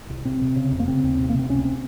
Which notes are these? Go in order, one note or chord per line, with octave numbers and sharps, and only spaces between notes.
C2
C3 C4
C3
C#3
F2
A#3
C#3 C4
D#2
C3
A#3
C3 C4
C#2 C#4
C4